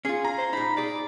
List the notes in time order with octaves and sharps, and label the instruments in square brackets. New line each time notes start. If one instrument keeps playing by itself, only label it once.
[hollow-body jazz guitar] C#4 F4 [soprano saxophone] G#4
[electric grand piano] A#5
[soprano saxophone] C5
[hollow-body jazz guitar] A#2 D#4 [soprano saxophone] B5
[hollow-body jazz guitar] D#4 G#4 [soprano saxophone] D5